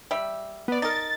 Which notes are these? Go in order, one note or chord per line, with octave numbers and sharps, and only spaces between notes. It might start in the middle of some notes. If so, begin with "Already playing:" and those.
G3 E5
B3 D5
D#4 A#4 A6